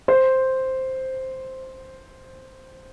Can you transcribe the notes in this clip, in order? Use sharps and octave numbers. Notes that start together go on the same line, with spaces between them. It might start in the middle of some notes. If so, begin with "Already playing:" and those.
C5